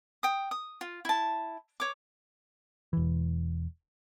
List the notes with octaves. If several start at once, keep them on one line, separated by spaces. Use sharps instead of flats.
G5 D#6
D#6
F4
E4 A5
C#5 D6
E1 E3